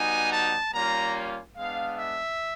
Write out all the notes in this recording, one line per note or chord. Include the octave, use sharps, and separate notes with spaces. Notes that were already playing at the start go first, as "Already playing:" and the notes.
Already playing: G3 B3 D#4 F#4 G#5
A5
G3 A#3 C#4 F4 A#5
G#3 B3 D4 F5
E5